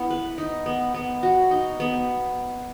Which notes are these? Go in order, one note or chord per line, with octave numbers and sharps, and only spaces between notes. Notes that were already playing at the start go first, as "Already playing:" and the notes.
Already playing: B3 E4
B4
D#4
B3
B3
F#4
D#4
B3